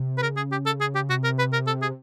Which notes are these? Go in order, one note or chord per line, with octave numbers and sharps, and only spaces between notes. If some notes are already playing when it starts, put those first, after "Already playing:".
Already playing: C3
B4
C#3 A#4
G#4
G4
A4
G#4
G4
C3 F#4
A#4
B4
A#4
A4
G#4